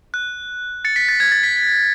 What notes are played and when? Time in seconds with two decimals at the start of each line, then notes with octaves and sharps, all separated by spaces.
0.14 F#6
0.85 A6 C#7
0.96 B6
1.09 A6
1.20 G#6
1.32 A6
1.43 B6
1.56 B6